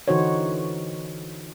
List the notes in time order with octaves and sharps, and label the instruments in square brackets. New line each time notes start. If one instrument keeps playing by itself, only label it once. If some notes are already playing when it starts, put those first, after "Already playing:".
[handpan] D3 E3 D#4 F#4 C5 C#5